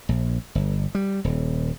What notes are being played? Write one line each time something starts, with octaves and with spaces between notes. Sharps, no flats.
A#1
G1
G3
D#1